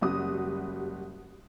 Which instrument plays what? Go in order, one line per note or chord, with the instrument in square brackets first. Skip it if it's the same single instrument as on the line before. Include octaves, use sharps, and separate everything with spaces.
[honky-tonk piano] F#1 G3 F#4 D#6